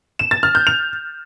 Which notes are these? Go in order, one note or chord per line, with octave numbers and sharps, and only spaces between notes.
E7
A6
F6
G6
F7